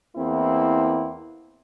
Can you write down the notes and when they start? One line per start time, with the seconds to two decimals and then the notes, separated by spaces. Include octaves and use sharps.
0.17 E2 A#3 C4 E4